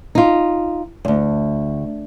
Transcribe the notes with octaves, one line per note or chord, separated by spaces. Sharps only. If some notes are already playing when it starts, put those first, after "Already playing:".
D#4 F4
D2 G2